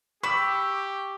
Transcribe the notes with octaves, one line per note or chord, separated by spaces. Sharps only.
G4 B5 C#6 D6 E6